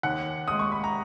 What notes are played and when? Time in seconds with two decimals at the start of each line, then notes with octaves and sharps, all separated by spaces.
0.03 D#2 F#5
0.48 G#3 D#6
0.59 C#6
0.72 B5
0.84 A#5